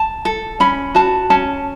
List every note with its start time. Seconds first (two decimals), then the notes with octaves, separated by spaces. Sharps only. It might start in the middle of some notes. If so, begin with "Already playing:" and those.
Already playing: A5
0.25 A4
0.60 C#4 B5
0.95 F#4 A5
1.30 C#4 A5